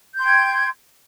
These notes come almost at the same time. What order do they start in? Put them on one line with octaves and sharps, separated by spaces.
G6 C6 G5 G#6